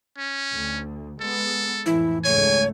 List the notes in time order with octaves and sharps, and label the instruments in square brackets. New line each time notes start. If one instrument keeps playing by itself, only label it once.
[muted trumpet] C#4
[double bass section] D2
[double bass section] G#3 B3 [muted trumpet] A4
[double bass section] F2 A2 E3 [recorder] E4
[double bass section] C#2 G#2 A3 [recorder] C#5 [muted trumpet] G#5